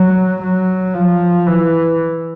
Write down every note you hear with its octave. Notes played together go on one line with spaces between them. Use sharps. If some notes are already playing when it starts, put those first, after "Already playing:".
Already playing: F#3
F#3
F3
E3